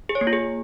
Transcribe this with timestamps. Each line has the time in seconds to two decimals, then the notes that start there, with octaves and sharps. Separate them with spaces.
0.09 G#4
0.15 C#5
0.21 A#3
0.27 F4
0.33 G#4